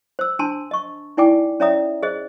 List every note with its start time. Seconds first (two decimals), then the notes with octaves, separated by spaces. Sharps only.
0.19 C5 E6
0.39 D4 G#5 A5 C6
0.71 D#5 C#6
1.17 D#4 E4 D5 G5 G#5 D6
1.60 C#4 C#5 D5 E5 A#5 D#6
2.03 G#4 C5 D#5